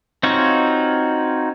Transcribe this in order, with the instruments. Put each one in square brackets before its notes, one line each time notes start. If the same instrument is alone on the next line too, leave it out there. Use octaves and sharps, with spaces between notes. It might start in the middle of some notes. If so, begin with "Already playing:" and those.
[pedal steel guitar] C4 D#4 F4 F#4 C#5